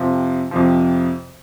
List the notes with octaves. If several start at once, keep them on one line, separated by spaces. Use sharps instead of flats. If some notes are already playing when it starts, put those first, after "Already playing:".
Already playing: F2 C3 F3
F2 C3 F3